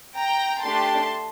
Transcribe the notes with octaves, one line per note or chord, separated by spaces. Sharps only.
G5 A#5
A3 D4 G4 A5 C6